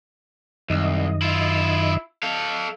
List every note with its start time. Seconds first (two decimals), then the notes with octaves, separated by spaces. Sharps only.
0.70 C2 F#2 D#3 D#5
1.22 E4 F4
2.23 A4 F5